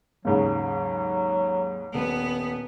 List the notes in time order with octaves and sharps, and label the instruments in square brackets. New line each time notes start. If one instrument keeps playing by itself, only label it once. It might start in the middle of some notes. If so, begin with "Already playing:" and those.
[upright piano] D#2 G#2 C#3 [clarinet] F#3
[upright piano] D#1 [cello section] B3